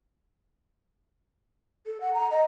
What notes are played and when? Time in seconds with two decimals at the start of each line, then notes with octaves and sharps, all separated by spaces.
1.86 A4
2.01 F#5
2.14 A#5
2.31 D#5